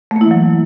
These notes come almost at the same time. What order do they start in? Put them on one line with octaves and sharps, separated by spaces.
A3 A#3 E4 E3 F#3